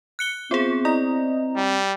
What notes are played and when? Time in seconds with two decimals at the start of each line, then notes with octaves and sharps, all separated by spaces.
0.19 F#6 C#7 G7
0.51 B3 C4 F4 G#4 C5
0.85 E4 D5 D#5 A#5
1.57 G3